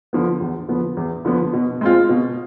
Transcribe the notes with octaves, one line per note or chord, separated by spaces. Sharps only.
D3 F3 B3
E2
D3 F3 B3
E2
D3 F3 B3
B2
G#3 C4 F4
B2